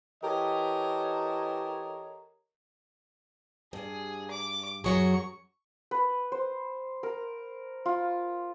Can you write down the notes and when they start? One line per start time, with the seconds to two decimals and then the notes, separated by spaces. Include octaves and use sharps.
0.23 E3 G4 A4 A#4 C#5 D#5
3.73 G2 G#4
4.30 D6
4.84 F#2 F#3 G#4 C#6
5.91 B4
6.32 C5
7.03 A#4
7.86 F4